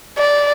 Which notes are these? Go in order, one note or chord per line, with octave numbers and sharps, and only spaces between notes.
D5